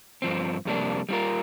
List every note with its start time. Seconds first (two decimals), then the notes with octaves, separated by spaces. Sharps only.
0.22 G2 F3 C4
0.65 F2 C3 G3 A#3 D4
1.09 G3 D4 F4 A#4